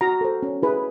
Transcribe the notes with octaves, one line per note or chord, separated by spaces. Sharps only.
F#4 A#5
A4 C5
C#4
E4 G#4 B4